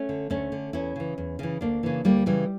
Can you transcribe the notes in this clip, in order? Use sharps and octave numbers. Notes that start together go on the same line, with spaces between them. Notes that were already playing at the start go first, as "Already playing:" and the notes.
Already playing: A3 C#4
D3
D2 A3 C#4
D3
E2 C#4 E4
C#3 E3
E2
C#3 E3
D2 A#3 D4
C#3 E3
D2 G3 A#3
C#3 E3 G3